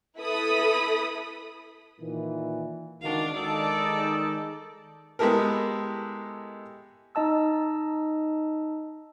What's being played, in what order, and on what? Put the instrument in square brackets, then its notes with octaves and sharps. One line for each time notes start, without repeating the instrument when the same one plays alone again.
[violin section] E4 A4 B4 B5 D#6
[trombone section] A#2 D#3 E3
[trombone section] C#2 D#3 F#4 [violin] D4 F5
[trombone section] D#3 G#3 [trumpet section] D#4 A4 [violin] D5
[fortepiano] G#3 B3 E4 G4 A4 A#4
[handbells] D#4 D#5 A5 E6